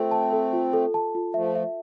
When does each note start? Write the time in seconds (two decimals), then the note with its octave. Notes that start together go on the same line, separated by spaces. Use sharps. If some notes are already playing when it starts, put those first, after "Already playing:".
Already playing: A3 C4 F4 A4
0.11 A5
0.33 A4
0.53 F4
0.73 A4
0.94 A5
1.15 F4
1.34 F3 A3 E5
1.55 E5